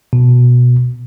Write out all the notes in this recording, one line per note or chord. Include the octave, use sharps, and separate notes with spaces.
B2